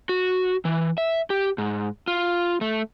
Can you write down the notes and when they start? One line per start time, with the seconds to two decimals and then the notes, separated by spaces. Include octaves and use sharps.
0.09 F#4
0.65 E3
0.98 E5
1.30 G4
1.58 G#2
2.08 F4
2.61 A3